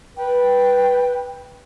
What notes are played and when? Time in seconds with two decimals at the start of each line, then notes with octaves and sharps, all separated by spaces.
0.17 B4 G5